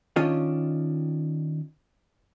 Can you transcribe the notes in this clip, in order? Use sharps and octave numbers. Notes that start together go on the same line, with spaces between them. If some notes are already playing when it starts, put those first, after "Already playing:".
D#3 C#4 D4 F4 D#5